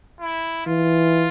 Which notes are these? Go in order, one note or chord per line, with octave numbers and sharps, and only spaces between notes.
E4
E3 F4